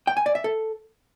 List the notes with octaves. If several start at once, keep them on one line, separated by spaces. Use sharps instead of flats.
G5
G#5
D5
E5
A4